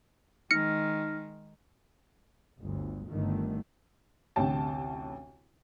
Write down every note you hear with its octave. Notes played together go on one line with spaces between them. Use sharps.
D#3 G#3 D#4 F6 A#6 C#7
G1 D2
G1 G2 D3 D#3 A3
A1 D2 C3 C#5 G5 A5